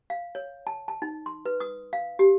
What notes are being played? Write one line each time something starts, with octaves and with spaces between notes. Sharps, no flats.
F5
C#5
A5
A5
D#4
C6
B4
D#6
F5
G4